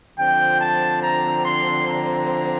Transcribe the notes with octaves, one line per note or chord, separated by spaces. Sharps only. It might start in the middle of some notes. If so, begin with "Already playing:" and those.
D3 F3 C4 G5
A5
A#5
C6
A#5